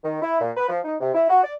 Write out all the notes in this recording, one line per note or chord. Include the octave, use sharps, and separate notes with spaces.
D#3
E4
A#2
B4
F3
D#4
C3
E4
F#4
D5